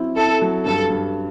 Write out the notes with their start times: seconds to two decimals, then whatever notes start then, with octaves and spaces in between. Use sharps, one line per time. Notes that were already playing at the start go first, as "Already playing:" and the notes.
Already playing: F#3 C4 E4
0.17 E4 A4
0.42 F#3
0.66 G2 A4
0.90 G2